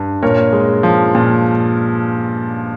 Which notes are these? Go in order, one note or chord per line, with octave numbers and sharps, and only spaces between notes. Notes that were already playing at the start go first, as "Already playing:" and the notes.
Already playing: G2
A#2 A#4 C#5
G#3
F3
A#2